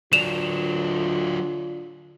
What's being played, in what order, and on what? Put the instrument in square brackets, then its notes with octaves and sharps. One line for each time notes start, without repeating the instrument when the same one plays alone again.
[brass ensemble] D3 F4 [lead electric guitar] F#3 D4 [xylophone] E7 F7